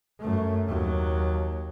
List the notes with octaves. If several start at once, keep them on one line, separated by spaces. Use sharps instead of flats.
F#2 A3
D#2 F#3